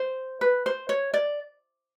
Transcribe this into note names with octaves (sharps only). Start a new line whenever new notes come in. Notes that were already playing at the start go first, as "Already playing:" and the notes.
Already playing: C5
B4
C5
C#5
D5